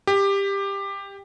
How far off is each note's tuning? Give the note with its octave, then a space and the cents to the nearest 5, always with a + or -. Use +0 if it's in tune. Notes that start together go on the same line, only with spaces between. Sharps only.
G4 +15